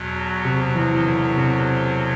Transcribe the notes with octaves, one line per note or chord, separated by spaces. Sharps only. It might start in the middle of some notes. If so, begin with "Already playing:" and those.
Already playing: E2 B2 F#3
C3
E3
D3
C3